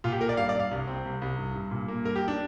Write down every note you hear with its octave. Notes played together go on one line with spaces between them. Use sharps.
A#2 F4
G4
A#3 A#4
D5
G2 F5
D5
G2 F5
C2
C4
C2
C2
G2
G2
A#2
A#3
G2 A#4
G4
D4